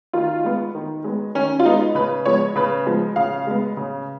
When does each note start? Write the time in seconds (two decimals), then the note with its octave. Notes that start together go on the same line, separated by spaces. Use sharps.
0.13 D#3 F4
0.44 G#3 B3
0.75 D#3
1.04 G#3 B3
1.35 D#3 C#4
1.60 F4
1.65 G#3 B3 D#4
1.95 C#3 B4
2.25 F3 G#3 B3 C#5
2.56 C#3 B4
2.86 F3 G#3 B3
3.16 C#3 F5
3.47 G#3 B3
3.77 C#3